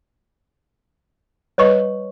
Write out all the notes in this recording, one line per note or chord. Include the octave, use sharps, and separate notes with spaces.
G3 B4 C#5 D#5 C#6